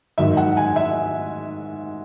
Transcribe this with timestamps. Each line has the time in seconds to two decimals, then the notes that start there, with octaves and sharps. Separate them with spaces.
0.18 G#2 D#3 F#3 E5
0.37 F#5
0.57 G#5
0.76 E5